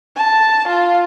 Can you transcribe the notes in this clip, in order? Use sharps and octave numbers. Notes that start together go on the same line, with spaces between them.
A5
F4